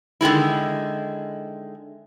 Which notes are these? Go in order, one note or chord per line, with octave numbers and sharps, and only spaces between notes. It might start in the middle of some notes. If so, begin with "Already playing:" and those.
D3 D#3 G#3 E4